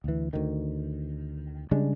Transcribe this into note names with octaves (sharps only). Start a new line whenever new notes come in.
D2 E3
D2 D#3
C#3 G3 G#3 D4